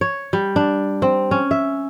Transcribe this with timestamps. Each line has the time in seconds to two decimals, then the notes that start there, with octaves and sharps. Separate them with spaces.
0.01 C#5
0.33 G3
0.56 D4
1.02 C4
1.31 C#4
1.51 E5